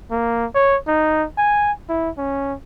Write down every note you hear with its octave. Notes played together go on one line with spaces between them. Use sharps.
A#3
C#5
D#4
G#5
E4
C#4